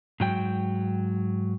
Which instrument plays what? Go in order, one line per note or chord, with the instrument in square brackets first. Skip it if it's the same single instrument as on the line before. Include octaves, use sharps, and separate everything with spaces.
[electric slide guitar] G#2 F#3 G5